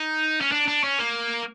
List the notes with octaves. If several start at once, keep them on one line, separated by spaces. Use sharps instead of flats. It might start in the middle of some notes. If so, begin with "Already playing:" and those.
Already playing: D#4
C#4
D4
D4
C#4
A#3